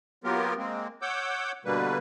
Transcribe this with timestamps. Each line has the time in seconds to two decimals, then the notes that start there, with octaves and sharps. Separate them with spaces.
0.24 F#3 A#3 B3 F4 G4 A#4
0.58 G#3 A#3 C4
1.02 C#5 F#5 D6 E6 G6
1.65 B2 D3 G3 A#3 B4